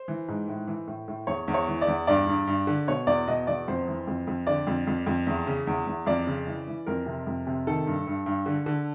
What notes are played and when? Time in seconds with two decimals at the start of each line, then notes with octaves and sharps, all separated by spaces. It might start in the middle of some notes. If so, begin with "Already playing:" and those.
Already playing: C5
0.08 E3
0.28 G#2
0.48 A2
0.68 E3
0.87 A2
1.08 A2
1.27 E2 C#5
1.48 E2
1.54 C#5
1.68 E3
1.81 D5
1.88 E2
2.07 G2 D5
2.27 G2
2.47 G2
2.67 D3
2.88 B2 C#5
3.07 E2 D5
3.28 B2 D#5
3.47 E2 D5
3.68 F2 C5
3.88 E3
4.07 F2
4.27 F2
4.47 D3 D5
4.67 F2
4.87 F2
5.06 F2
5.27 E2
5.47 C#3
5.67 E2
5.87 E2
6.06 F2 D5
6.27 C#3
6.47 E3
6.67 E3
6.86 F2 A#4
7.06 C3
7.27 F2
7.47 C3
7.67 D#3 A4
7.87 G2
8.07 G2
8.26 G2
8.46 D3
8.66 D3